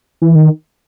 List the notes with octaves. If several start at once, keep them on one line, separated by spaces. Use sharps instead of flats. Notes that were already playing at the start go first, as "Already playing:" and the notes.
E3
D#3